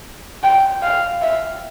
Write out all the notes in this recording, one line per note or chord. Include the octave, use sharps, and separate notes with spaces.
G5
F5
E5